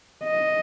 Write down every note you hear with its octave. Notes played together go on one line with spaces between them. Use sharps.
D#5